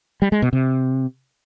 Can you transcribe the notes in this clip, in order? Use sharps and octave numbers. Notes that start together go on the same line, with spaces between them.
G3
G#3
B2
C3